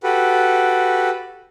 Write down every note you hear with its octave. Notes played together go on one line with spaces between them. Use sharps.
F#4 G4 A4 B4